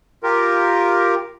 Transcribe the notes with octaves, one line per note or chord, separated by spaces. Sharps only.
F4 G4 A#4